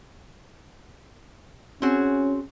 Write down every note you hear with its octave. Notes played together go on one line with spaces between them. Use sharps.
C4 C#4 F#4 G#4